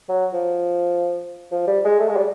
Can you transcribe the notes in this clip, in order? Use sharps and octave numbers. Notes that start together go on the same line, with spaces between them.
F#3
F3
F3
G3
G#3
A3
G#3
G3